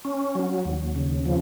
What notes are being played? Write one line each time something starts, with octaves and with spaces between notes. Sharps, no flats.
C#4
F#3
D#2
C#3
F3